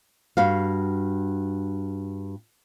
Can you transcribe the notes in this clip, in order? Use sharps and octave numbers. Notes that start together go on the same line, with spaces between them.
G2 F#4 F5